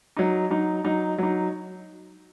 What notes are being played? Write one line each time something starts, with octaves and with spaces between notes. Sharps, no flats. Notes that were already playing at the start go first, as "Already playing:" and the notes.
F#3 D#4
F#3 D#4
F#3 D#4
F#3 D#4